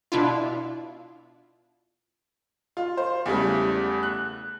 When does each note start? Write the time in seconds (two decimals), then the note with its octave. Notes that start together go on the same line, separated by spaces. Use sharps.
0.12 B2 D4 E4 F4
2.77 F4
2.97 C5
3.26 E2 C#3 G3 A3
4.03 F#6